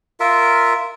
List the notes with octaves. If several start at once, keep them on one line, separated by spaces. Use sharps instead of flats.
F4 A#4 E5